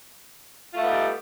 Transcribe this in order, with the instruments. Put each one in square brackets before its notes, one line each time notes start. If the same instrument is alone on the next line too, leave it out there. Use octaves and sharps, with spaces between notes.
[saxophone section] F4
A3
B3
D#4
G3